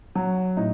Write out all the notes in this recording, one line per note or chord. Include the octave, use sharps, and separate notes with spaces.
F#3
A2 D#4